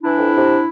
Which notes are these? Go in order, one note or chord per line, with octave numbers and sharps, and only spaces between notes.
E3 D4 E4
F2
C3